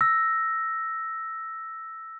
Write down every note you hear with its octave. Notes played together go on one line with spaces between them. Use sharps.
E6 A#6